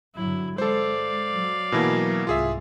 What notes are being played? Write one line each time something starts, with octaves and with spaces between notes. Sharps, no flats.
G2 D3 F#3 E4
G#3 A4 C5 D5 F5
F#3
B2 E3 A#3
C2 G#2 F4 G#4 E5